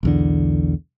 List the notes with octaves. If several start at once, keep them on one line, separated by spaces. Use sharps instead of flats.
B1 E2 D3